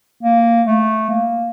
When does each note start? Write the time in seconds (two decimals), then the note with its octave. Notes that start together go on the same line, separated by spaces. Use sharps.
0.23 A#3
0.67 A3
1.10 A#3